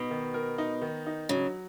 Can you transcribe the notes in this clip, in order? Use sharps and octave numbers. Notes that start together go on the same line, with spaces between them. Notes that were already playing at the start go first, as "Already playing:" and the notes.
Already playing: B2 D#4
D#3
A#4
D#4
D#3
D#4
C#3 F#3